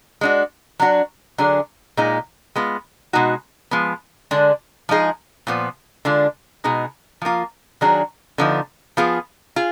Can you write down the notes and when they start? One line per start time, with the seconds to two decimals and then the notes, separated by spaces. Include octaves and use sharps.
0.21 G#3 D4 F#4
0.80 F#3 D4 F#4
1.38 D3 F#3 D4 G#4
1.97 A#2 G#3 D#4
2.56 G#3 B3 F4
3.13 B2 G#3 D#4 F#4
3.71 F3 G#3 B3
4.31 D3 G#3 D4
4.89 F3 G#3 D#4 G#4
5.47 A#2 F3 B3
6.05 D3 G#3 D4 F4
6.64 B2 G#3 D#4 G#4
7.22 F3 A#3 F4
7.81 D#3 F#3 D4 G#4
8.38 D3 F3 B3 D#4
8.97 F3 B3 F4 G#4
9.56 F4 G#4